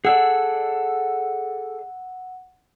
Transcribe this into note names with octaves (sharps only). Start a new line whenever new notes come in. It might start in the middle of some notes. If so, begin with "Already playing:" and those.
G#4 A4 D5 F#5 E6